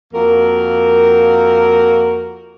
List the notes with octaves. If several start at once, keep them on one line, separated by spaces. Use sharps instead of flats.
F2 A#3 F#4 A#4